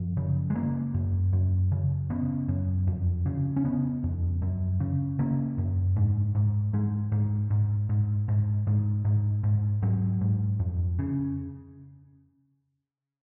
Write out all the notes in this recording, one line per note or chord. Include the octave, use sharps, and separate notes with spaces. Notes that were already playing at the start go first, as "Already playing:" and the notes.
Already playing: F#2 F3
C#3
G#3
C#3 A#3
F#2
F#2
C#3
C#3 B3
F#2
F2
C#3
C#4
C#3 B3
F2
F#2
C#3
C#3 A#3
F#2
G#2
G#2
G#2 G#3
G#2
G#2
G#2
G#2
G#2
G#2
G#2
G#2 F#3
G#2
F2
C#3